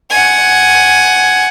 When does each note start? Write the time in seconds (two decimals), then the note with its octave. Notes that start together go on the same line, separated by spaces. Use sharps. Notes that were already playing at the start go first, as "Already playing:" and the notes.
0.10 F#5 G#5